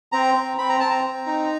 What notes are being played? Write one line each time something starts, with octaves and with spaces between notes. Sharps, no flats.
C4 A#5
C4
C4 B5
A#5
C4 A5
A#5
C4
D#4